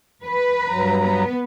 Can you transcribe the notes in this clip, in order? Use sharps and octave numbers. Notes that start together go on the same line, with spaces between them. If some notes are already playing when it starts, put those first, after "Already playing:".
B4
G2 F#3 A#5
B3 B4